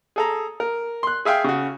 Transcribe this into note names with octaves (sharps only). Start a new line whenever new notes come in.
G#4 A4 A#5
A#4
C6 F#6
G#4 E5 F5 G5
C#3 F#4